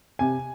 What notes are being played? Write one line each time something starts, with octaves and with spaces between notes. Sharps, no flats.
C3 G#5